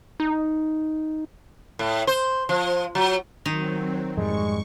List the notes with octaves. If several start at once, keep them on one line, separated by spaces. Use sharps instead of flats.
D#4
A2
C5
F3
F#3
D#3 F#3 C4 D#4
F2 G#2 G3 G#3 C#6